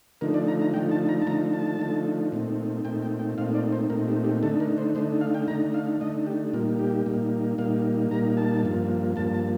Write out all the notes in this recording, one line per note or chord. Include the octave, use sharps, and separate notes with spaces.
D3 F3 A3 D#4 A#4
D5
A#5
A#5
D3 F3 A3 D#4 G5
A5
A#5
A5
D3 F3 A3 D#4 A#5
A5
D3 F3 A3 D#4
A#2 A3 C4 D#4
A#2 A3 C4 D#4 G5
G5
G5
A#2 A3 C4 D#4 F5
D5
C5
A#2 A3 C4 D#4 A#4
G4
G4
D3 A3 D#4 A4
A#4
C5
D3 A3 D#4 C5
F5
G5
D3 A3 D#4 A#5
F5
D3 A3 D#4 D#5
G4
A#2 G3 A#3 D#4 F4
G4
A#2 G3 A#3 D#4
A#2 G3 A#3 D#4 F5
A#2 G3 A#3 D#4 A#5
A5
G2 F3 A#3
G2 F3 A#3 A5
A5